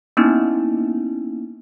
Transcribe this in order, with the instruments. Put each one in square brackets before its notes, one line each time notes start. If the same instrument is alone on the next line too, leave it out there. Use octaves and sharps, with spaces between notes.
[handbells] A#3 B3 C#4 D#4 E4